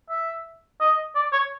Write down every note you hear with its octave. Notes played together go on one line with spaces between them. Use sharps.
E5
D#5
D5
C#5